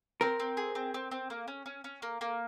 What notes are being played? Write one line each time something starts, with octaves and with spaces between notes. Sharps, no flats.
C4 A#4
C4
G#4
C4
C4
C4
A#3
C#4
C#4
C#4
A#3
A#3